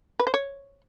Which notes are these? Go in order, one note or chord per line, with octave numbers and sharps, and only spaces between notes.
B4
C5
C#5